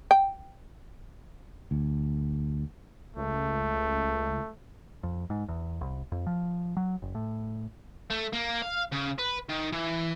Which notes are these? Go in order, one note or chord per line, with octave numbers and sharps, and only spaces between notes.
G5
D2
C#2 A3
F2
G#2
E2
C2
F2
F3
F#3
F#1
A2
A3
A#3
F5
C#3
B4
D#3
E3